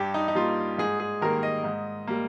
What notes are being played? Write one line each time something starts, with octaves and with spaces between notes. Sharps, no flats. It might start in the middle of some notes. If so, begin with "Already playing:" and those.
Already playing: G2 G4
D#4
D#4
G3 A#3 F4
G#2 G#4
G#4
D#3 G3 A#3 A#4
D#5
G#2
G3 A#3